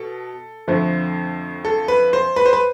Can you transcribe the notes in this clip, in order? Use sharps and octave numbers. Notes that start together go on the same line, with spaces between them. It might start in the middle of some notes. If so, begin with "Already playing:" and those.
Already playing: B2 A4
F2 D3 F3 A3
A4
B4
C5
B4
C5
B4